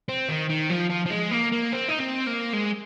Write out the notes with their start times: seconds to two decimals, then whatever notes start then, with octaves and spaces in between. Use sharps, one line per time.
0.09 C4
0.29 D#3
0.50 D#3
0.70 F3
0.90 F3
1.06 F3
1.10 G#3
1.31 A#3
1.52 A#3
1.73 C4
1.88 D#4
1.99 C4
2.26 A#3
2.53 G#3